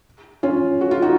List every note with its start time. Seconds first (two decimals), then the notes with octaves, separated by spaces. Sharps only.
0.43 C#4 F4
0.81 F#4
0.91 F4
1.02 D#4 F#4